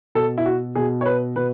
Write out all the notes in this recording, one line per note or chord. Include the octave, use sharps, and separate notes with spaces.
B2 A4
E4
F#4
B2 G#4
C#5
B4
B2 B4